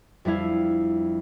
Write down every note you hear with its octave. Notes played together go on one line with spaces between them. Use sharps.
F2 G3 D4 E4 F5 G#6